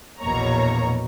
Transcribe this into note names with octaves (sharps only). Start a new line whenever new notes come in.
A#1 E2 B2 A#3 C#5 A#5